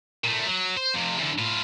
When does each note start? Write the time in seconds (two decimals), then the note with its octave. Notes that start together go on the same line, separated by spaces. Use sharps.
0.24 A#2 A3
0.46 F#3
0.77 C5
0.94 F2 C3
1.18 E2 D3
1.38 A2 F4